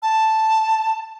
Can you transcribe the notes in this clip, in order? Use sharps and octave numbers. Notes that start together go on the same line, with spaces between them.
A5